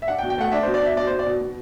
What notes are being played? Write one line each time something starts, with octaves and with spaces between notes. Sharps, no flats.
E5
D4 F#5
G5
B2
G5
A3 F#5
D4 E5
B2 C5
D5
D4 E5
B2 D5
B2 C5
D5
B2
B2